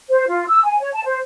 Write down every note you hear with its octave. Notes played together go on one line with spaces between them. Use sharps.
C5
F4
E6
G#5
C#5
A5
C5